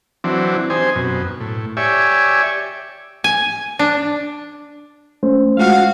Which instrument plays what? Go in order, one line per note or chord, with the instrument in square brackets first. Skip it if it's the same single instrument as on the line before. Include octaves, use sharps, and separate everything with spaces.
[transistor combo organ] E3 F#3 C4 D4
C4 D#4 G4 C5 G#5
F#2 B2
A2
G4 C#5 D5 E5 G#5
[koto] G#5
D4
[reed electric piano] A3 C#4 C5
[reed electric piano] G#3 F4 F#5 [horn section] F#4 F5